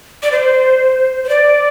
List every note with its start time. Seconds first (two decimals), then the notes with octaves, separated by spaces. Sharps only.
0.23 D5
0.32 C5
1.24 C5
1.29 D5